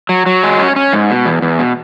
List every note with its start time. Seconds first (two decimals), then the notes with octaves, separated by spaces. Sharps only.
0.09 F#3
0.26 F#3
0.43 G#3
0.59 C#4
0.76 C#4
0.93 G#2
1.10 B2
1.26 E2
1.42 E2
1.59 B2